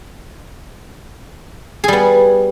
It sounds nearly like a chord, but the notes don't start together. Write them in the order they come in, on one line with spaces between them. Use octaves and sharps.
G#4 G3 B3